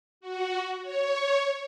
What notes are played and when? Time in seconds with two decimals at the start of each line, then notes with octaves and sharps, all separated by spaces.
0.21 F#4
0.82 C#5